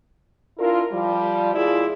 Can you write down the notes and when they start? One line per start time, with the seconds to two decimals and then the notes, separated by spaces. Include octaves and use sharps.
0.58 D4 E4 F4 A#4
0.91 F3 G3
1.55 D#2 E4 F4 G#4 D5